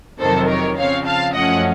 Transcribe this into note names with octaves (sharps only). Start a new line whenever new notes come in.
F2 C3 D#3 F#3 A4 C5
A#4 C#5
C#3 F3 C4 C#5 F5
F5 A5
F#2 F3 A3 C#4 D#5 F#5